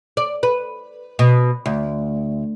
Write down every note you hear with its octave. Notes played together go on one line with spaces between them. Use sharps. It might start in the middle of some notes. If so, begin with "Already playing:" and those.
D5
B4
B2
D2